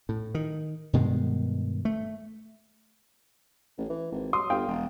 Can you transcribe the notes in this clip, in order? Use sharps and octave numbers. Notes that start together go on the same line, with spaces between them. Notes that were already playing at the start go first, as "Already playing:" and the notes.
A2
D#3
G2 B2 D#3 G#3
A3
A1
E3
G#1
F#3 C6 D#6
G1 F5 G5
E1